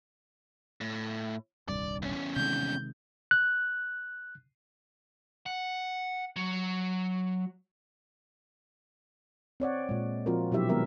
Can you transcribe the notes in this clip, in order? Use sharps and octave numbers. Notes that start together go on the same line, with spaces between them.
A2
D#1 C2 G2 D5
E2 C#4
C3 D#3 G#3 G6
F#6
F#5
F#3
C4 C#5 D5 F#5
A#2 G#3
F3 C4 F4 F#4 A#4
B2 F#3 D4 E4 G4 E5
D#3 G#3 B3 A#4 E5